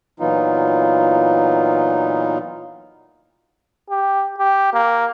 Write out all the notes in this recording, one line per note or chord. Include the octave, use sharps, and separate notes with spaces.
A#2 E3 F#3 B3 D#4 F4
G4
G4
A#3